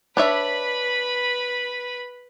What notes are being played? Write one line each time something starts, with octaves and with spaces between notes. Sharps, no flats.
D4 B4 C#5 E5 B5